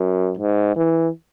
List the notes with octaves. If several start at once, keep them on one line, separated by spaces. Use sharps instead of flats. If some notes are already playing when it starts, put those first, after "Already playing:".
Already playing: F#2
G#2
E3